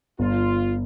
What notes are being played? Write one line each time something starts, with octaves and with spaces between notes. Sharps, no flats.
G1 F4